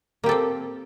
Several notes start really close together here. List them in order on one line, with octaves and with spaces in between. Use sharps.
A#3 G4 A4 C4